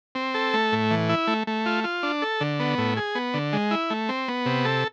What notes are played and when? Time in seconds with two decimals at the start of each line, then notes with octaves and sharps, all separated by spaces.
0.15 C4
0.34 A4
0.54 A3
0.72 A2
0.91 E3
1.09 E4
1.27 A3
1.47 A3
1.66 F4
1.84 F4
2.03 D4
2.22 A4
2.41 D3
2.60 B3
2.78 A2
2.97 G#4
3.15 B3
3.34 D3
3.53 G#3
3.71 E4
3.90 A3
4.09 C4
4.28 B3
4.46 C3
4.65 A4